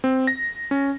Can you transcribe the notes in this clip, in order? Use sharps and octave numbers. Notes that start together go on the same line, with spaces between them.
C4
A#6
C#4